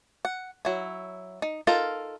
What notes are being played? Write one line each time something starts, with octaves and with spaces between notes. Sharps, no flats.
F#5
F#3 E4
D#4
D#4 F4 A4 A#4